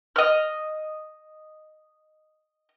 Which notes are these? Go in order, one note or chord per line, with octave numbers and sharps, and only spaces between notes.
D#5 F6